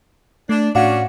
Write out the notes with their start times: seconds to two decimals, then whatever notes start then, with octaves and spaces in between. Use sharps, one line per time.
0.49 A3 D4
0.75 A2 C#4 D4 F#4 F5 F#5